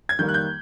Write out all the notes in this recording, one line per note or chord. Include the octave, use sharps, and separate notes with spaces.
G#6
D#3 G3 A#3 G6
F#6
G6